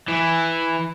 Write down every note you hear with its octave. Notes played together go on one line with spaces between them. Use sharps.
E3